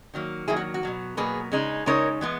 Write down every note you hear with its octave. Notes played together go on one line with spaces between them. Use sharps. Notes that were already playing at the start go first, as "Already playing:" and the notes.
D#3 F#3 A#3
D#3 F#3 A#3 E4 G#4
F#4
F#4
B2 F#3 A#3
B2 F#3 A#3 G#4 B4
C#3 G#3 D#4
C#3 G#3 D#4 A#4 C#5
E3 G#3 B3